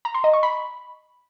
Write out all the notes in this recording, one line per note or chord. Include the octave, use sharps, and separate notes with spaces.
A#5
C6
D#5
C#6
B5